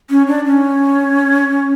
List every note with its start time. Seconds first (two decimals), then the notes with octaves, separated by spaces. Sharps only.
0.10 C#4
0.28 D4
0.45 C#4